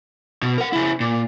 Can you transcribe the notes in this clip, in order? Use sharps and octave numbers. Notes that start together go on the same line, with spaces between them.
B2
A#4 F#5
C#3 E4
A#2